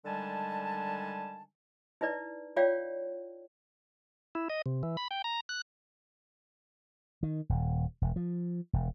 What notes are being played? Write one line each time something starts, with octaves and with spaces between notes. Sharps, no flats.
D3 D#3 G3 G#3 G#5 A5
D#4 E4 B4 D5
F4 C#5 D5 F5 G5
E4
D#5
C3
E3
B5
G5
A#5
F#6
D#3
D#1
E1
F3
E1